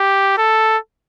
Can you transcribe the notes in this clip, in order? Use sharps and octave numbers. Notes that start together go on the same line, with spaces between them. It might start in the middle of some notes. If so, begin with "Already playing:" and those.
Already playing: G4
A4